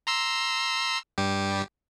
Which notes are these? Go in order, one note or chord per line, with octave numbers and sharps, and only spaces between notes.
A#5 C6 E6
G2 G3 G4